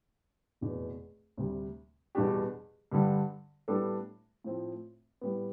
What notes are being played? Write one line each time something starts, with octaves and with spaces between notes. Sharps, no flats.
F1 E2 B2
D2 C3 G3
E2 B2 G3 D4 G4
G2 D3 G3
A2 G3 B3 D4 A4
A2 F3 C4
A2 G3 B3